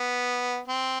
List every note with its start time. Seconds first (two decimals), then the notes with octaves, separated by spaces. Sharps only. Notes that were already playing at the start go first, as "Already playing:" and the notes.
Already playing: B3
0.68 C4